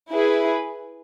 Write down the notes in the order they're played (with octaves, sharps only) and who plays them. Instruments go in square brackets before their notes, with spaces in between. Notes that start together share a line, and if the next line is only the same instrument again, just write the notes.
[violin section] E4 G#4 B4